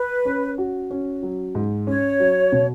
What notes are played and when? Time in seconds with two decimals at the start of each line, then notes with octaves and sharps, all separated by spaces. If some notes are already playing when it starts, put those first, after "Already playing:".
Already playing: B4
0.25 C#4
0.58 F#4
0.91 C#4
1.23 F#3
1.55 G#2
1.87 C#4 C#5
2.20 F#3
2.52 B2